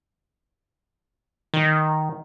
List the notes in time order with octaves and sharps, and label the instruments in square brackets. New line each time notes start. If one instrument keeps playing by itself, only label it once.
[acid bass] D#3